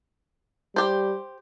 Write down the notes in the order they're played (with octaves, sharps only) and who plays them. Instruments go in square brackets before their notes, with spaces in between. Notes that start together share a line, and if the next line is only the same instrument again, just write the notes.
[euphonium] G3 [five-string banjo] G4 C5